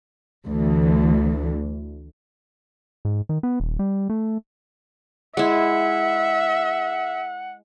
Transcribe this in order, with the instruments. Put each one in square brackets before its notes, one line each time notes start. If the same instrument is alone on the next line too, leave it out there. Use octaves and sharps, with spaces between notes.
[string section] D2 E3
[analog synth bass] G#2
D#3
B3
D#1
G3
A3
[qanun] G#3 E4 [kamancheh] E5 [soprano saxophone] F#5